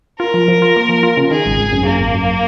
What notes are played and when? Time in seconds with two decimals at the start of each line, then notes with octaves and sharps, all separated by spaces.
0.20 F4 A#4
0.34 F3
0.48 F3
0.62 F4
0.76 A#3
0.89 F3
1.03 F4
1.17 C#3
1.31 D#3 G#4
1.46 G#1
1.59 G#1
1.72 F#2
1.87 F#2 A#3
2.00 G#1
2.14 F#2